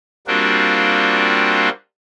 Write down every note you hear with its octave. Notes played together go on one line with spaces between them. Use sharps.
G3 A#3 C4 D4 F4 F#4